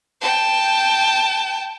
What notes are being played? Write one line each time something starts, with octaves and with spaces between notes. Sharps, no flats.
G5 A5